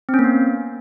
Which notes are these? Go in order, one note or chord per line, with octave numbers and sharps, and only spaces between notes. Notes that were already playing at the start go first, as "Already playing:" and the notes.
C4
C#4
A#3
B3